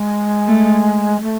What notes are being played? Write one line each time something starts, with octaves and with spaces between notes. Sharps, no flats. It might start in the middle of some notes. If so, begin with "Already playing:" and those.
Already playing: G#3
A3
A3